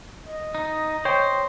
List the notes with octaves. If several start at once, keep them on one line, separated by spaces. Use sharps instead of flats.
D#5
D#4
C5 C#5 G5